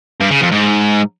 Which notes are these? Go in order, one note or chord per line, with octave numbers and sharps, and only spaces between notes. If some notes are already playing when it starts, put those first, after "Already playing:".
G2
C#3
F2
G#2